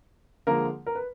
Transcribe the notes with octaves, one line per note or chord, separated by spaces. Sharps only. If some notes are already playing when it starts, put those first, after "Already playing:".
D3 F3 G#3 A#3 A#4
A#4
B4